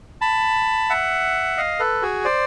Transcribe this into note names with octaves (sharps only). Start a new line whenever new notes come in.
A5 B5
E5 F#5
D#5 F5
A4 B4
F#4 G#4
C5 D5